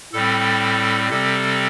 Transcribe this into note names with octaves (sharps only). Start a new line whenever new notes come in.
A2 G3 C4 A4
C3 G3 C4 A4